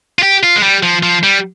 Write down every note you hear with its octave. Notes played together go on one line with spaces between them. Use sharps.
F4
G4
F4
G#3
G3
F3
F3
G3